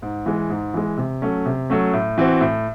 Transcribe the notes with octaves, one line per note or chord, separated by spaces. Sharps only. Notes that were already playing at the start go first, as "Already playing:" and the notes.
G#2
E3 G#3
G#2
E3 G#3
C3
F#3 A3 C#4
C3
F#3 A3 C#4
A2
E3 C4 F#4
A2